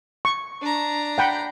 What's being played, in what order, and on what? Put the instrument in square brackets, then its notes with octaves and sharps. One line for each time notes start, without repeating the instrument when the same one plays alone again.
[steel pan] C#6
[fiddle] D4 A#5
[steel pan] F#5 G5 B5